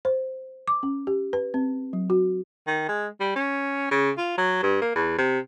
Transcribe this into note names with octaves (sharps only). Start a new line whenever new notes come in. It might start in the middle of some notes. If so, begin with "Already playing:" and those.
C5
D6
C#4
G4
B4
C4
F#3
F#4
D#3
G#3
G3
C#4
C#3
F4
F#3
G2
A#3
E2
C3